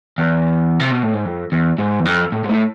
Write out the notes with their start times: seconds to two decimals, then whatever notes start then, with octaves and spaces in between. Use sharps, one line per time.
0.18 E2
0.80 C3
0.91 B2
1.03 A2
1.14 G#2
1.25 F2
1.52 E2
1.79 G#2
2.00 E2
2.05 F2
2.32 A2
2.44 G#2
2.50 A2